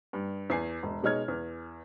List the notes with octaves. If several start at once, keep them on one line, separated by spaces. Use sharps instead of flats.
G2
E2 G#5 C7
E1
B2 G#3 D#4 C#5 F6 G#6
E2